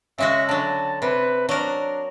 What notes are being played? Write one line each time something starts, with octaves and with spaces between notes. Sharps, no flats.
C#3 G#3 F#4 E5
D3 F#3 A5
C3 B4
F#3 D4 A#4